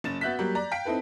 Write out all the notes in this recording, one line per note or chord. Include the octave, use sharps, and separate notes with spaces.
F#1 C#4 A6 E7
B3 F#4 E5 F#6 G6 B6
F#3 G3 A#3
D5 A#5
F5 G5 B6 D7
C4 D#4 E4 A4 B4